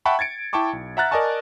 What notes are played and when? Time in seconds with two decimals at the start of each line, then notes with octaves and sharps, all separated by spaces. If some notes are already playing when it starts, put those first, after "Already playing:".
0.05 E5 F#5 G5 A5 B5 C#6
0.19 G#6 A6 C#7 D7
0.53 E4 G5 A5 C#6 D6
0.73 B1
0.97 E5 F#5 A#5 F6 F#6 A6
1.11 A#4 D5 D#5 G#5 A5 C#6